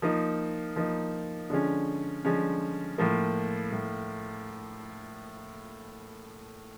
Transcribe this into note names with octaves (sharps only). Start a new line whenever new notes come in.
F3 A#3 D#4
F3 A#3 D#4
D3 F3 G#3 C#4
D3 F3 G#3 C#4
A2 F3 A#3
A2